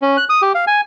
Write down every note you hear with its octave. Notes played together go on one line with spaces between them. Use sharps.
C#4
F#6
D#6
G4
F5
G#5